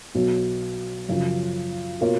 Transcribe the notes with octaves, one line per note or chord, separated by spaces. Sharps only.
B1 B2 F#3
F#2 C#3 F3
B2 A#3 F4 A#4 C#5